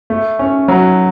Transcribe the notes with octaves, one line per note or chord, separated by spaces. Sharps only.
A3
C#4
F#3